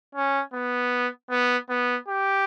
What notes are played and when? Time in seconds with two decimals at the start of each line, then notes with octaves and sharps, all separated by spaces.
0.15 C#4
0.54 B3
1.30 B3
1.69 B3
2.08 G4